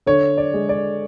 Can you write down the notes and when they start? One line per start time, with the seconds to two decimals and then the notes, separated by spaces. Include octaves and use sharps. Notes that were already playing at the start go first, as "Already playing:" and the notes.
0.06 D3 C#5
0.38 D5
0.54 G#3
0.69 D5